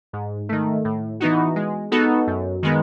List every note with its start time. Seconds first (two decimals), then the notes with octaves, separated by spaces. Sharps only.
0.13 G#2
0.49 D#3 A3
0.85 A2
1.20 E3 B3 D#4 F#4
1.56 G#3
1.91 B3 D#4 F#4 A4
2.27 F#2
2.63 D#3 G#3 B3